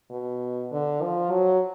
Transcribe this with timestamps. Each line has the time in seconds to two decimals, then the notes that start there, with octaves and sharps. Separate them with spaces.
0.11 B2
0.72 D3
1.02 F3
1.31 F#3